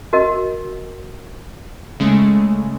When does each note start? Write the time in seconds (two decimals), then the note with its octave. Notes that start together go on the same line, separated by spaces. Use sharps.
0.13 F#4 A#4 D#5
2.00 C#3 G#3 A3